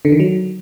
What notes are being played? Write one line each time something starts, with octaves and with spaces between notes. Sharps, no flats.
D3
D#3
F#3